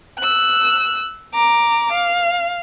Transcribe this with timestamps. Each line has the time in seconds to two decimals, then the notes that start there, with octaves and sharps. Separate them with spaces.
0.19 E6 F#6
1.34 A#5 D6
1.92 F5